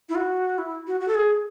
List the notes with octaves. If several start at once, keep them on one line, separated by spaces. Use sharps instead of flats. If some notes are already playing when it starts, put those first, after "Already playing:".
E4
F#4
E4
F#4
F#4
A4
G#4